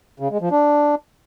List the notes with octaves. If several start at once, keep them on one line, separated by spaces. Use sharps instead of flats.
C#3
G#3
F3
D4